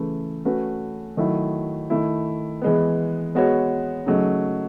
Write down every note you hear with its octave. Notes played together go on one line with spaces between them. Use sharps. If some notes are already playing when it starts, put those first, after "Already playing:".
Already playing: C#3 E3 A3
A3 C#4 F#4 B4
D#3 F#3 A3 E4
D#3 A3 E4
E3 G#3 B3
G#3 B3 F#4 C#5
C#3 F#3 A3 D#4